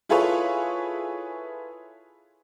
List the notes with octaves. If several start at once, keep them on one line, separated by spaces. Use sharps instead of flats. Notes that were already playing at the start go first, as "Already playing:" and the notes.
E4 F4 G#4 A4 B4 C#5